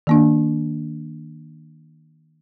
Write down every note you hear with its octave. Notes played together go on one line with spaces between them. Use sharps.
D#3 A#3 D4